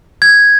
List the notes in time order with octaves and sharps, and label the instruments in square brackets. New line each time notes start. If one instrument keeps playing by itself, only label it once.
[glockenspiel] G#6